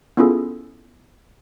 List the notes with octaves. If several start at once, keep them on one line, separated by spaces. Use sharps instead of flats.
B3 C#4 E4 F4 G#4 A4